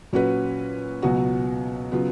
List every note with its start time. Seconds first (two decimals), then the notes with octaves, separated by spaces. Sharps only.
0.13 A#2 F#3 C#4 F#4 B4
1.02 C#2 B2 F#3 B3 F#4
1.92 C#3 F#3 B3 F4